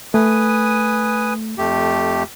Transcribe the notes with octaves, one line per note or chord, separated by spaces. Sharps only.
A3 B4 G#5 D#6
F2 A3 G4